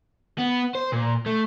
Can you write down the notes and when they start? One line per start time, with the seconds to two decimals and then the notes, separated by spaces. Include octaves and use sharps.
0.38 B3
0.75 C5
0.93 A#2
1.26 A3